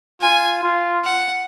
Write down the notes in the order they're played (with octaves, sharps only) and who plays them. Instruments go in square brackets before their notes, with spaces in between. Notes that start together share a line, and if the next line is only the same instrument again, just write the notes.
[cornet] F4 [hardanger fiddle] G#5
[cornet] F4
[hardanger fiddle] F#5